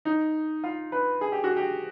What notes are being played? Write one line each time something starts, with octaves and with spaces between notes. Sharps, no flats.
D#4
F4
B4
G#4
G4
F#4
G4